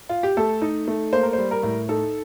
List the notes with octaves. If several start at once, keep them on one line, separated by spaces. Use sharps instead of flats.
F4
G4
A3 A4
D#4
A3
A#3 C5
A#4
G3 C5
A#4
A2
D#4 A4